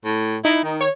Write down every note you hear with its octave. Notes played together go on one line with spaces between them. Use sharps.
A2
D#4 E4
D#3
C#5